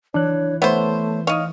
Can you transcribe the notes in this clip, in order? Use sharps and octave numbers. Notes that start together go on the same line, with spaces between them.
E3 D4 C#5 F#6
A3 B3 C5 C#5 E5
D#4 C#5 D#5 F5 F6